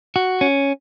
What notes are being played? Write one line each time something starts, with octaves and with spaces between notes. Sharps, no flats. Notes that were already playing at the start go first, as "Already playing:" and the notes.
F#4
C#4